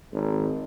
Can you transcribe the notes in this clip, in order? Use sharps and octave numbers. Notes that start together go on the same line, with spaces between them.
G#1